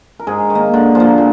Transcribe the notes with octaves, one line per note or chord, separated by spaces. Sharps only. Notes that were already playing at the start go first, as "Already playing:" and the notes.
A#4
G#2 G#4
D#3
A#3
D3
F3
A#3
A#2